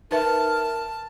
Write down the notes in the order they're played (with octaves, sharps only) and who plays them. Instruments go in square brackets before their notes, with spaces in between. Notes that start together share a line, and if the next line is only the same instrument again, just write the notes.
[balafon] D#4 B4 E5 [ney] A#4 [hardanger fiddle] A5